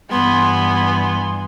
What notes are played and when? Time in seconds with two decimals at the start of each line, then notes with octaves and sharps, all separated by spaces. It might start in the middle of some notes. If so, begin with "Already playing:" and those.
0.11 G2 E3 B3 G#5 C6